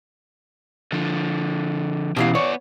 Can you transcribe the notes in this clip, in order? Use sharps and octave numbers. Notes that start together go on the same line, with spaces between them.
D3 F3
B2 E3 C#4 G4 F5
B3 C#5 D5